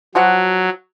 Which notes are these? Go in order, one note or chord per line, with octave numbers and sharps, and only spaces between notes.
F3 F#3 F#4 F#5